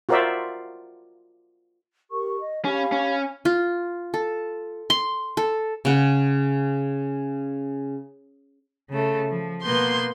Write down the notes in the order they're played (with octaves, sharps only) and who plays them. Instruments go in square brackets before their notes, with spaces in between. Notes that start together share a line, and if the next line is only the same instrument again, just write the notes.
[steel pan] F4 F#4 A#4 C5 D5 E5
[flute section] G4 A#4 C#6
D#5
[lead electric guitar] C#4 [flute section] G4 F5 B5
[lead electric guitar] C#4
[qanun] F4
A4
C6
A4
C#3 F#5
[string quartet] C#3 A3
F3
B2 A#3 B3 C6 G6